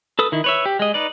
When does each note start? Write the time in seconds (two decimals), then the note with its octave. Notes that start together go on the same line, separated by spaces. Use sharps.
0.19 A4 B4 D#6
0.32 D#3 E4
0.44 B4 C#5 E5
0.66 G4
0.79 G#3 D#5
0.94 D#4 B4 D5